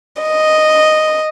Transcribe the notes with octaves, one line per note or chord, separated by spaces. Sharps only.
D#5